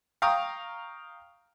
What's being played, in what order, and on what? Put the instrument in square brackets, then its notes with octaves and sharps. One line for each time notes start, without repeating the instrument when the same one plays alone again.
[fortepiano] F5 G5 A#5 C#6 D#6